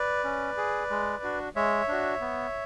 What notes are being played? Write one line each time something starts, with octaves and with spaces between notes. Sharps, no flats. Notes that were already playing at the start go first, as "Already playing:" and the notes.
Already playing: B4 D5
C#4
G#4
G#3
D4 F#4
G#3 C#5 E5
D4 F#4
B3